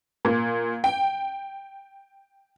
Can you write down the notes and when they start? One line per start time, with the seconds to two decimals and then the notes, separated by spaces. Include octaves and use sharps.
0.25 A#2
0.84 G5